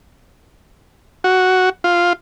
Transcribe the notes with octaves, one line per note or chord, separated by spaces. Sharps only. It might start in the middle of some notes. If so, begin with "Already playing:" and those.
F#4
F4